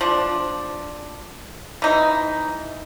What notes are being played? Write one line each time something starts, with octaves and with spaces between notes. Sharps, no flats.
F3 D4
E3 D#4